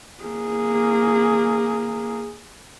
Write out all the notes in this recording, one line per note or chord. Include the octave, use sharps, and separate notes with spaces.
A#3 G#4